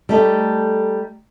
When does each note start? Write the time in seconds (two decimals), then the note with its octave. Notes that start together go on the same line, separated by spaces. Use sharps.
0.09 G3 A3 D#4